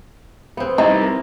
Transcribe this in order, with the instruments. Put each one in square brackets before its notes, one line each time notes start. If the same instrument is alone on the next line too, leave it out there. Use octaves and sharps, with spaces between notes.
[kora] B3 C4
[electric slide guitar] G3 C4 [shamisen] D#4 [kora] E4
[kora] A#4